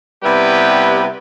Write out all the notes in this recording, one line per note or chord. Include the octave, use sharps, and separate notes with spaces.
C3 G3 B3 E4 G4 B4